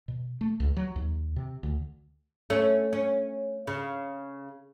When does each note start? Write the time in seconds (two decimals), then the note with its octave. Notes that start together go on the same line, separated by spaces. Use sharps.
0.08 B2
0.41 A3
0.60 C#2
0.77 F#3
0.96 D#2
1.36 C3
1.63 D2
2.50 A3 C#4
2.93 C#4
3.67 C#3